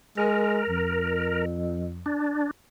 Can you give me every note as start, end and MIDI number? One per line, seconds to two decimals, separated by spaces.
0.18 0.62 56
0.18 1.45 70
0.69 2.13 41
2.06 2.51 62